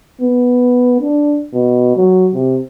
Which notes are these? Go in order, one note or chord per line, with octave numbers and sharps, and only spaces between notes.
B3
D4
B2
F#3
C3